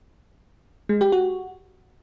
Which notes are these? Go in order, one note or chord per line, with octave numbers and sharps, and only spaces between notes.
G#3
G4
F#4